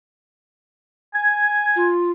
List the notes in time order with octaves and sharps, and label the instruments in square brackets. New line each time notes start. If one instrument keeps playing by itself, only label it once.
[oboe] G#5 [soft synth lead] G#6
[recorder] F4